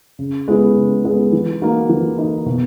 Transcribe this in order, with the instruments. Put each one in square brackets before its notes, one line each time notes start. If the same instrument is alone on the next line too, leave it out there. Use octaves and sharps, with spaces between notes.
[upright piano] C#3
G#3 B3 E4
C#3
G#3 B3 E4
E3
A#3 D#4 F#4
E3
A#3 D#4 F#4
B2